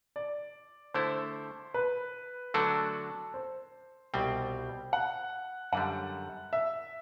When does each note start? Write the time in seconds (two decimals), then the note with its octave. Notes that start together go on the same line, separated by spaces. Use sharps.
0.16 D5
0.94 D3 A3 E4 C5
1.74 B4
2.54 D3 F#3 A3 D4 F#4 A4
3.34 C5
4.14 C2 B2 G3 C4 G5
4.93 F#5
5.73 F#2 D3 G3 F#5
6.53 E5